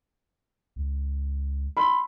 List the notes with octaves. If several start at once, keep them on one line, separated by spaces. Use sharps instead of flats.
C#2
B5 C6 E6